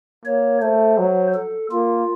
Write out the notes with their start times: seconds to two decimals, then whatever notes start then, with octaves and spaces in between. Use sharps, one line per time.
0.25 A#3 C#5
0.61 A3 C5
0.98 F#3
1.34 A4
1.71 A#3 F4